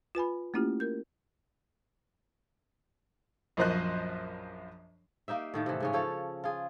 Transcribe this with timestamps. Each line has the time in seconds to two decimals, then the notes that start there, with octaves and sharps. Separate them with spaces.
0.15 F4 B4 G#5 B5
0.54 A3 A#3 C#4 E4 F4 G4
0.80 A#4 G6
3.57 A#1 F#2 F3 C5 D#5 F#6
5.28 A#3 D#4 G4 E5
5.54 A2 D#3 A3
5.66 C3 E3
5.80 G#2 C#3 C#4
5.93 F3 A4 C#5
6.44 F4 G#4